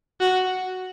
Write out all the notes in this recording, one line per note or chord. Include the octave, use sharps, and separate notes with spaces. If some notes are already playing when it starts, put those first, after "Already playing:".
F#4